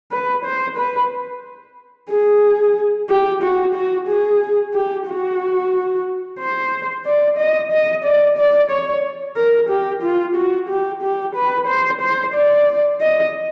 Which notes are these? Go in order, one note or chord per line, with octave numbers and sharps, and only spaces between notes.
B4
C5
B4
G#4
G4
F#4
F#4
G#4
G4
F#4
C5
D5
D#5
D#5
D5
D5
C#5
A#4
G4
F4
F#4
G4
G4
B4
C5
C5
D5
D#5